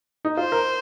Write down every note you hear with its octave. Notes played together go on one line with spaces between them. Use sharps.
D#4
F4 C5
A#4